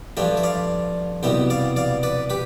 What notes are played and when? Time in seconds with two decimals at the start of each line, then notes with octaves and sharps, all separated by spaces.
0.17 G2 F3 A3 D4 E5 G5
0.37 E5
0.44 D5 F5
1.23 C2 B2 G3 B3 E5 G5
1.50 D5 F5
1.76 D5 F5
2.03 B4 D5
2.30 G4 B4